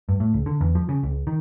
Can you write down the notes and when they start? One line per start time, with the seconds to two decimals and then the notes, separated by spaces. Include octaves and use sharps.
0.09 G2
0.20 A2
0.34 C#2
0.46 D3
0.61 E2
0.75 F3
0.89 C#3
1.03 C#2
1.27 D#3